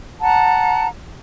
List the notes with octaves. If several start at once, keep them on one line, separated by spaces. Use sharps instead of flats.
F#5 A5 A#5